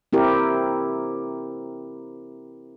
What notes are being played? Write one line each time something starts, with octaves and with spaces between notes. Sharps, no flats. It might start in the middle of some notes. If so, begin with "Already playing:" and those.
C4 E4 G4 A#4